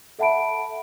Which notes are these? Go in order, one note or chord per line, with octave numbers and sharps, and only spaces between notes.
A4 E5 F#5 A5 B5 D7